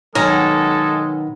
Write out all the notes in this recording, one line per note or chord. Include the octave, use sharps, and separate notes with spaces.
B2 D#3 F#3 G#3 C#4 A4 A#5